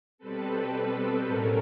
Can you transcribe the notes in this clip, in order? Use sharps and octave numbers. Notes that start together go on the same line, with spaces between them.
B2 G3 C4 A4 B4
A2 F#3 A3 C#4 A#4